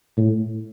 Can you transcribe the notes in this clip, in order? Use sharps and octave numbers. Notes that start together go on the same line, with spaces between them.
A2